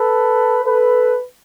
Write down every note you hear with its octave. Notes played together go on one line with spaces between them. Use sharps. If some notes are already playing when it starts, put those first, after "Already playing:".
Already playing: A4 B4
A4 B4